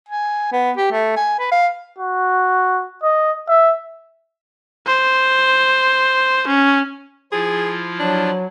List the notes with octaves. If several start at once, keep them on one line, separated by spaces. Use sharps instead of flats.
G#5
B3
G4
A3
G#5
B4
F5
F#4
D#5
E5
C5
C#4
F3 E4 F4 G#4
F#3 D4